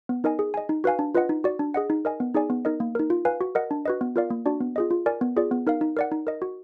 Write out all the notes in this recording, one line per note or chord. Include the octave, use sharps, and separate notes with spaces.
B3
D#4 A#4 D#5 G#5
G#4
D#5 G#5
D#4
F#4 B4 F5 G#5
D4
F4 B4 D#5 F#5
D#4
F#4 D5
D4
G#4 D#5 F#5
D#4
A#4 D#5 G#5
B3
D#4 G#4 D5 G#5
B3
D#4 A#4 D#5
A#3
D#4 A#4
F4
B4 F5 G#5
F#4
A#4 D#5 F#5
D4
F#4 B4 D#5
B3
F4 A#4 D5 F5
A#3
D4 F#4 D5
B3
F4 G#4 D#5
F4
A#4 D5 G#5
B3
F4 G#4 D5
B3
D#4 A#4 F5
D#4
A#4 D5 F#5
D#4
A#4 D#5
F#4